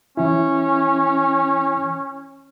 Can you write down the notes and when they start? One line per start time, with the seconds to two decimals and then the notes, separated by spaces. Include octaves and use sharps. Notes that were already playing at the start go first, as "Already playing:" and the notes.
0.17 E3 C#4 E4